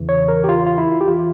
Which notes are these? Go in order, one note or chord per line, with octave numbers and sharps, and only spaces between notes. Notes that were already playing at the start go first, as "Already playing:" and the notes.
Already playing: E2 C#3 E3
C#5
A#4
G4
F4
F4
E4
G4
E3 F4